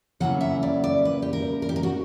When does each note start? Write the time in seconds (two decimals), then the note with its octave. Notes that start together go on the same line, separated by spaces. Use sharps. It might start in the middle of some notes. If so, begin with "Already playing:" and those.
0.20 C#3 F#3 A#3 C#4 E4 F#5
0.41 E5
0.63 D5
0.84 D5
1.05 B4
1.22 G4
1.33 A#4
1.62 A#4
1.69 G4
1.76 A#4
1.83 F#4